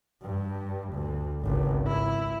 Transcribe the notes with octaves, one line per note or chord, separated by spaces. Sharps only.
G2
D2
G#1 C#2
E4